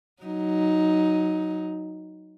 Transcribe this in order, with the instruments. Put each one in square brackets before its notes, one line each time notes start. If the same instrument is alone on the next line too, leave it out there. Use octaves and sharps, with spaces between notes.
[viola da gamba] F#3 D#4